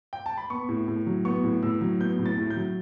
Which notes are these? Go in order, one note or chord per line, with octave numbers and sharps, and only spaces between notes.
G5
A5
B5
B3 C#6
A2
A2
F#3
B3 C#6
A2
A2 E6
F#3
B3 G6
A2
A6
A2
G6
F#3